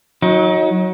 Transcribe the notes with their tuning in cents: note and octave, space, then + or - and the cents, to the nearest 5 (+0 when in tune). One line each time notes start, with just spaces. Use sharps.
F#3 -10 D#4 +25